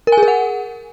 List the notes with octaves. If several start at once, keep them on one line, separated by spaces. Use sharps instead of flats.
A#4
G#5
G#4
A#4
F#5